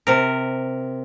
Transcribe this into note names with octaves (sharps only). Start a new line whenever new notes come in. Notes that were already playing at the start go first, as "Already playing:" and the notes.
C3 A#4